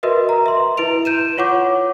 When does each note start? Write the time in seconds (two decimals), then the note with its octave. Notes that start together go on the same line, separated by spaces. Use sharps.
0.03 F#4 A#4 B4 D#5 E5
0.29 A#5
0.46 E5 C6
0.77 E4 B4 D7 F7
1.05 G6 D#7 E7
1.37 F4 C#5 F#5 C#6 D6